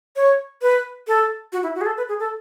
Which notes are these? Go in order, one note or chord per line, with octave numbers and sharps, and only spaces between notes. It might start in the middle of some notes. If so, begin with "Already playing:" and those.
C#5
B4
A4
F#4
E4
F#4
G#4
A4
B4
G#4
A4